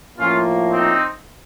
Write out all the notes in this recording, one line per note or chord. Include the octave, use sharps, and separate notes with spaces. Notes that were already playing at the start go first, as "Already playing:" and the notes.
A2 F3 A#3 C#4 F4
C4 D#4